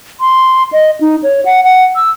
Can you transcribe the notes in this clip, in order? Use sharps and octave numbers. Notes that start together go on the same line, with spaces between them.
C6
D#5
D#4
C#5
F#5
F#5
E6